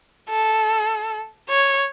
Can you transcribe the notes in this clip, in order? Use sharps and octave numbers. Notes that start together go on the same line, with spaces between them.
A4
C#5